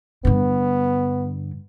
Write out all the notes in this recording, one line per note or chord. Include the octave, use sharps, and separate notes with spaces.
G2 D3 B3